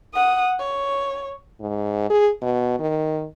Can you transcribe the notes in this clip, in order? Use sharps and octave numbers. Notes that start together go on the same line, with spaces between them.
F#5 D#6
C#5
G#2
G#4
B2
D#3